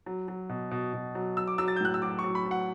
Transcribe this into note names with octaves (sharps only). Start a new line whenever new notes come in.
F#3
F#3
B2
B2
B2
F#3
F#3 E6
D6
F#3 E6
A6
G6
A2 F#6
E6
F#3 D6
C#6
F#3
B5
F#3
F#5